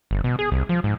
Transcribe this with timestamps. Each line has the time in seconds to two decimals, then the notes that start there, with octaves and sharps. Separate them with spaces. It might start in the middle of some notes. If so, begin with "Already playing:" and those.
0.11 G1
0.24 B2
0.39 G#4
0.52 C2
0.69 F3
0.84 G#2